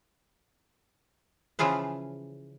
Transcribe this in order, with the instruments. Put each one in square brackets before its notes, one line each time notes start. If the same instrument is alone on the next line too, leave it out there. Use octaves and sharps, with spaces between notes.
[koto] C#3 E3 F3 F4 G#4 B4